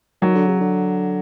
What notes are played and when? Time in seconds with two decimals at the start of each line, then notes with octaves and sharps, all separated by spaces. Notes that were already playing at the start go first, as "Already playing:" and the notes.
0.22 D#3 F#3
0.35 D3
0.48 C#3
0.60 D3